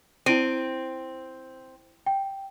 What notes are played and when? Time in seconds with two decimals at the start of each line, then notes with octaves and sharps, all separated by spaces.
0.26 C4 E4 D7 D#7
2.06 G5